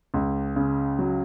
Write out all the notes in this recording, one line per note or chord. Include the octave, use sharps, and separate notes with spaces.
C#2
C#3
F#3